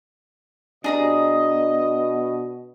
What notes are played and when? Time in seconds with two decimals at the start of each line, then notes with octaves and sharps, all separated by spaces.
0.84 B2 D4 G#4 D#5 A#5 D#6